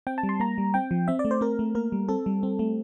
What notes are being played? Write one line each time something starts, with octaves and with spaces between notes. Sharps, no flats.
C4 G5
A5
G3
C6
A#3 A#5
G3
C4 G5
F3
C4 E5
D5
A3
C5
C4 A#4
A3
A#3 A#4
G3
C4 A4
G3
C4
A3